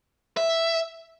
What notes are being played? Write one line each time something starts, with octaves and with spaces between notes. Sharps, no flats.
E5